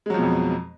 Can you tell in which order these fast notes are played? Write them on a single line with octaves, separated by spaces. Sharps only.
G#3 F#3 F3 B2 F2